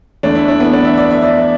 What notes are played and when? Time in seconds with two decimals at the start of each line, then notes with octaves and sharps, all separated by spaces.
0.23 E2 E3 A3 D4
0.35 E4
0.48 D4
0.60 B3
0.73 D4
0.85 E5
0.97 D5
1.11 E5
1.22 D5